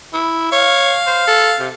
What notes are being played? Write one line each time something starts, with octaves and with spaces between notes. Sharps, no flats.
E4
C#5 F5
C5
A4
C3